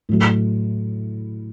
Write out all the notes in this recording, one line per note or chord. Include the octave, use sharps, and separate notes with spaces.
A2 F#3 A3